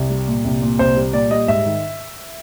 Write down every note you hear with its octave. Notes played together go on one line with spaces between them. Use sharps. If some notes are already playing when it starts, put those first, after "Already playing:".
Already playing: C2
G3
A#2
C2
A#2
C2 C5
G3
A#2 D5
G3 D#5
G#2 E5
D#3